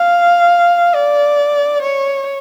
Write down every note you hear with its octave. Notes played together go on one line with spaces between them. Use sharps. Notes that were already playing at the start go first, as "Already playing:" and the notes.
Already playing: F5
D5
C#5